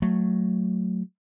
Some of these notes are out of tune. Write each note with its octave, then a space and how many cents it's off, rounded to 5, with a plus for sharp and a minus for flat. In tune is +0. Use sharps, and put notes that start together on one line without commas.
F#3 +0 A3 +0